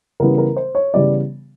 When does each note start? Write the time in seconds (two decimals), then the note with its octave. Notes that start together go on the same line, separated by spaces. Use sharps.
0.20 C#3 E3 G3 B3 A#4
0.38 A#4
0.56 C5
0.75 C#5
0.94 C#3 E3 G3 B3 D5